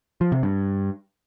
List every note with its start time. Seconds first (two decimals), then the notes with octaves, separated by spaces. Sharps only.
0.21 F3
0.32 C3
0.43 G2